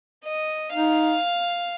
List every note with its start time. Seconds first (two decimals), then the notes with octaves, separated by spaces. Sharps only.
0.25 D#5
0.73 D#4 F5